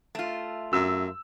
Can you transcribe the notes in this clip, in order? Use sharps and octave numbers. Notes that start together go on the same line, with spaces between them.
A3 F4
F#2 E6